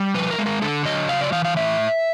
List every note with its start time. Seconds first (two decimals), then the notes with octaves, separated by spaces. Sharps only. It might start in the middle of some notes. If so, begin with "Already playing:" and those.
Already playing: G3
0.14 F3 B4
0.31 A#4
0.38 G#3
0.46 A#4
0.62 D3 A4
0.85 F#3 D#5
1.09 C#3 F5
1.21 D5
1.32 E3 F5
1.45 F5
1.56 A2 E5